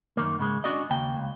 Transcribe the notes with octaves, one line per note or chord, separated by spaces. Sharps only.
F#2 D#3 A#3
G#2 C#3 G#3
C#4 D4 F#4 D5 D#5
D#2 C#3 A#3 G5
C#2